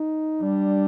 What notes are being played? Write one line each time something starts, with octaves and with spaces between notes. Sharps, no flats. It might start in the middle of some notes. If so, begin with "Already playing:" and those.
Already playing: D#4
G3 D4